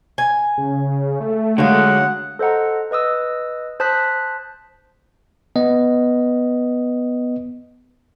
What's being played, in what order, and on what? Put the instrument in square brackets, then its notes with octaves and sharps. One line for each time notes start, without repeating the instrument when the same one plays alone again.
[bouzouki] G#5
[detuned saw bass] C#3
A3
[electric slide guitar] D3 G#3 [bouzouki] F#3 F5 [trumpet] F#5
[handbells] A4 C5 D#5 F#5 A#5
B4 D#5 D#6 E6
C5 A5 D#6 F#6 B6
[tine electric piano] B3 D#5